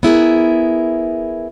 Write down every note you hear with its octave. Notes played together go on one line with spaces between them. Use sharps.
B3 E4 G#4 A#4